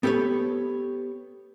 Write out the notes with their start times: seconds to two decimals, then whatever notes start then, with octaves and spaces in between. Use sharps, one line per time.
0.03 B3 G4 A4 B4 C#5